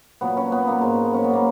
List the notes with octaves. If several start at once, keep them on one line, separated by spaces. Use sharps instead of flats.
A#2 F#3 B3
C#4
A#2 F#3 B3
A#3
G#2 F#3 G#3
G#2 F#3 C#4
B3
A#3